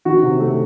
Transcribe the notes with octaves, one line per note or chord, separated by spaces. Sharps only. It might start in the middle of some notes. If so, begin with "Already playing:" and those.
D#3 F#4
C3
A3